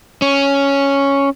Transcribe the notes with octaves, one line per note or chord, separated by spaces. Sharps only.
C#4